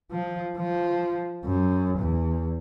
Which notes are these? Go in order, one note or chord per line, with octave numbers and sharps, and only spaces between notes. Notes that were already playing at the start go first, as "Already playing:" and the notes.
F3
F3
F#2
E2